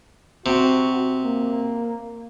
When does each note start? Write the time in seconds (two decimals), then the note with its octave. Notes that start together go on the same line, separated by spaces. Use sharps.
0.46 C3 F#4
1.24 A#3